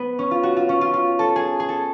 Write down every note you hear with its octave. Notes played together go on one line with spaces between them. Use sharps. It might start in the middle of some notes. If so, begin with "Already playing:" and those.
Already playing: B3
C#4
F4
F#4
F4
C#4
F4
F4
A4
G#4
G#4
A4